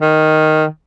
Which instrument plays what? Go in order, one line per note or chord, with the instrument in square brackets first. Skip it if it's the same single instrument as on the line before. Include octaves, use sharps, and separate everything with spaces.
[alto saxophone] D#3